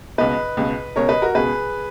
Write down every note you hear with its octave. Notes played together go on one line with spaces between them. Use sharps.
C#2 B2 B4 D#5
C#2 B2
C#2 B2 A#4 C#5
B4 D#5
F#4 A#4
C#2 B2 G#4 B4